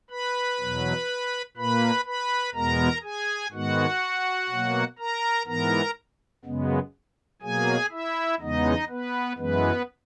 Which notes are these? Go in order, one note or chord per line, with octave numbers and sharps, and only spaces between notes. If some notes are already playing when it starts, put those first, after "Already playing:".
B4 B5
E2 B2 F#3
A#2 A#3 B4 B5
B4 B5
E2 B2 G#3 B3 A#4 A#5
G#4 G#5
G#2 D#3 G#3 B3 F#4 F#5
B2 F#3 A#3
A#4 A#5
G#2 E3 B3 A#4 A#5
F#2 C#3 G#3 B3
B2 F#3 A#3 G#4 G#5
E4 E5
E2 C#3 G#3 B3 D#4 D#5
B3 B4
F#2 E3 G#3 B3 B4